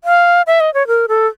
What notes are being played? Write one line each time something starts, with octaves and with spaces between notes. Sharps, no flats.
F5
E5
D#5
C#5
A#4
A4